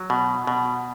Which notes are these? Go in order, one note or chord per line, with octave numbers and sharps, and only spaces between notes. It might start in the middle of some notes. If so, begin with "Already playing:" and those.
Already playing: F#3
B2
B2